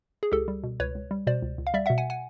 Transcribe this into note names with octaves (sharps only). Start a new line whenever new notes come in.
G#4
C#2 G4 A4
G3
B2
C#2 B4 C#5
C#2
G3
B2 C5 D5
C#2
C#2
F5
G3 D5 E5
B2 E5 F#5
F#5 G#5
F#5 G#5